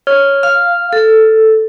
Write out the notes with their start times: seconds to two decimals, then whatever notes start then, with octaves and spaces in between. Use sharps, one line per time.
0.07 C#5 F6
0.43 F5 F6
0.93 A4